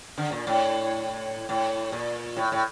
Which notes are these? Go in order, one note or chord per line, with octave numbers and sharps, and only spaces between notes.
D3
A#2
A2
A2
A#2
A2
A2